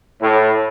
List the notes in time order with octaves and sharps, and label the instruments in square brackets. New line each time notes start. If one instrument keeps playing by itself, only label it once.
[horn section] A2